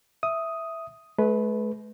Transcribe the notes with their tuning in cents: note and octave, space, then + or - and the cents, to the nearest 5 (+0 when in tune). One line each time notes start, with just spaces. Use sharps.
E5 +0 D#6 +5
A3 -45 B4 +0